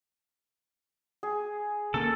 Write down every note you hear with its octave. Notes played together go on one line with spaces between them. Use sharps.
G#4
C#3 A#3 A4